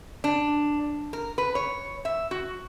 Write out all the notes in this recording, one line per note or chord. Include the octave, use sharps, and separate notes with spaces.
D4
A#4
B4
C#5
E5
F#4